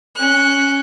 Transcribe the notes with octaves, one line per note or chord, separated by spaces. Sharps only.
C#4 F#6